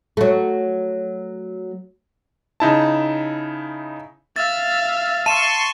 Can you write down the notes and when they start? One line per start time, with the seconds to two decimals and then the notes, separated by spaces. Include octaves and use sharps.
0.17 F#3 A3
2.60 C#3 D#4 E4 A5
4.36 E5 F5 A6
5.26 A5 C6 C#6 D#7 E7